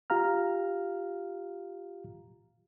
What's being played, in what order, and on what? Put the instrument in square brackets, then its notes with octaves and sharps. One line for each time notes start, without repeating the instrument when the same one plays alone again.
[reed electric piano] F4 G4 F5 A#5 F6